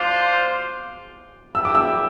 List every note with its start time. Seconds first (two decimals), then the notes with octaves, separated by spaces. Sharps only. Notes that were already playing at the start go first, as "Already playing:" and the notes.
Already playing: D4 F4 C5 F5 D6
1.54 E4 B4 E5 G5 E6
1.65 D6
1.75 E6